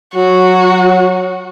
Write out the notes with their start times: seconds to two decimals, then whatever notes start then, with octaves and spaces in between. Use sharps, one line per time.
0.15 F#3 F#4